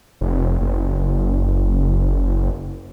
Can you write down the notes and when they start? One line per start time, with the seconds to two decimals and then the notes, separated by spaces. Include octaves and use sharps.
0.21 F1
0.61 F#1